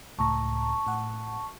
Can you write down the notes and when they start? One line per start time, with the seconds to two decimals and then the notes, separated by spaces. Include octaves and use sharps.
0.19 C#2 A2 A5 A#5 C#6
0.87 A2 F#5